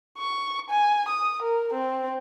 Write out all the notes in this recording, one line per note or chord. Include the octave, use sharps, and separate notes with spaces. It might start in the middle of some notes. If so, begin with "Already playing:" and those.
C#6
G#5
D#6
A#4
C4